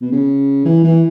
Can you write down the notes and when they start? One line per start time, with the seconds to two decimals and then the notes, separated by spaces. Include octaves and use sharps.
0.01 B2
0.12 C#3
0.65 E3
0.84 E3